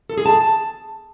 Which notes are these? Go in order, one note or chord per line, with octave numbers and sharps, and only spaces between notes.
A4
G#4
A5